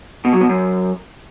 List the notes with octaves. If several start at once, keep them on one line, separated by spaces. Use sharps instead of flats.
B2
F#3
B2
F#2